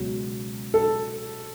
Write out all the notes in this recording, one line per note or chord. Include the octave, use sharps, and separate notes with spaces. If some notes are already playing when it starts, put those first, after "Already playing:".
Already playing: C#2 B2 F#3
A4